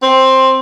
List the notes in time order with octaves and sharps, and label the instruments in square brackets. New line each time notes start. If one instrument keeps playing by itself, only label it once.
[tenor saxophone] C4